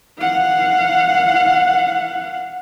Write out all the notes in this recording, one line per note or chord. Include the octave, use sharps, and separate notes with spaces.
F5 F#5